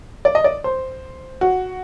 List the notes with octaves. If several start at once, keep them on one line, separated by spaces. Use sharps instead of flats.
D5
D#5
D5
C5
F#4